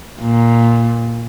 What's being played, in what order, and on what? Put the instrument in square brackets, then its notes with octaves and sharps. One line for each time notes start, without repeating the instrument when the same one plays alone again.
[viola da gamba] A#2